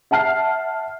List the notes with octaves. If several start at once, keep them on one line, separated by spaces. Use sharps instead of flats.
E5 F#5 A5 F6 C7